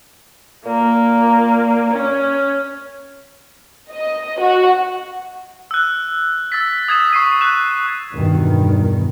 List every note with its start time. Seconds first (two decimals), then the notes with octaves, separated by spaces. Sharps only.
0.65 A#2 A#3
1.91 C#4
3.91 D#5
4.41 F#4
5.71 E6 F#6
6.52 E6 A6 B6
6.88 D#6 G#6 B6 E7
7.13 C#6 C7 D#7
7.41 F#6 E7
8.13 E2 G2 B2 D#3